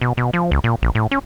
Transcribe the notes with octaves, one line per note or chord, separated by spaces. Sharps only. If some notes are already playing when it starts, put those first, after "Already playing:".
B2
B2
F3
C#2
A#2
A#1
A2
C#4